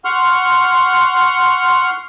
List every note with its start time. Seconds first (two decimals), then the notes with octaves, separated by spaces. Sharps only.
0.05 F#5 C6 C#6 F6